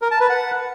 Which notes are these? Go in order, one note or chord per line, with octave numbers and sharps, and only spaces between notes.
A#4
A5
B4
F#5